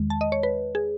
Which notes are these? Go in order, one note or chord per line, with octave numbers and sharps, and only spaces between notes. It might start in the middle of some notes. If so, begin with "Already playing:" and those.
Already playing: E2 D#3 G#3
A5
D#5
C#5
B4
G#4